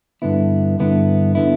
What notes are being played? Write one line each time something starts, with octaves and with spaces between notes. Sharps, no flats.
G2 D3 B3 E4
G2 D3 B3 E4
D3 B3 E4